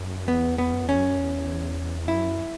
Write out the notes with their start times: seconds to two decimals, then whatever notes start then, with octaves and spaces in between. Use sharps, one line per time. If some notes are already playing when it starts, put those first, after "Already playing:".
Already playing: F#2
0.28 E2 B3
0.58 B3
0.73 F#2
0.85 E2 C#4
0.96 F#2
1.19 E2
2.08 F#2 E4